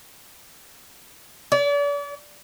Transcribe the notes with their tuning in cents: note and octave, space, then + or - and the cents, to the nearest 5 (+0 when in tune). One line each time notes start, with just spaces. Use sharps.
D5 -40